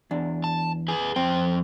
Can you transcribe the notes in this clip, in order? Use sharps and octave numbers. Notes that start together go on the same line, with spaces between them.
E2 D4
A5
G#4 B4 G#5
F2 F3 C4 G5